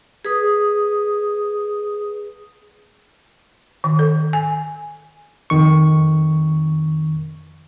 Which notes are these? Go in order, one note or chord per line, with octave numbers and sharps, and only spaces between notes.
G#4 B4 D#6
D#3
A4
G#5
F2 D#3 C#6